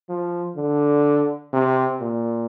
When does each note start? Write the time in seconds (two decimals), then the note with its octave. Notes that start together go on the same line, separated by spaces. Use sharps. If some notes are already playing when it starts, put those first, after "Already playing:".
0.09 F3
0.57 D3
1.53 C3
2.01 A#2